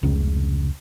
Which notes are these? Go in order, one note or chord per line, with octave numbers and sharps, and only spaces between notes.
F1 C#2 C#3